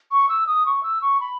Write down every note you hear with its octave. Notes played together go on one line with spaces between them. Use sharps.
C#6
E6
D#6
C#6
E6
C#6
B5